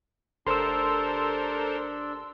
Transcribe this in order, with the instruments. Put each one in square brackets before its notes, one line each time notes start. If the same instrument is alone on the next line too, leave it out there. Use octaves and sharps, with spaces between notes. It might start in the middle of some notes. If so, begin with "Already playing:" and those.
[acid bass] F1 [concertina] D4 [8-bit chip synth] A4 A#4 C5 [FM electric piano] C6 E6